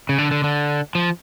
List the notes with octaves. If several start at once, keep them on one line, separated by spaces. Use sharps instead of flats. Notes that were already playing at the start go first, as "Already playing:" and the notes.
C#3
D3
D3
D3
F3